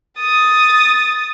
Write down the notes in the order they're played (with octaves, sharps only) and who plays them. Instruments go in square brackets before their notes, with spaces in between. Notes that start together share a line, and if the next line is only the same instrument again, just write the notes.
[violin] D#6 A6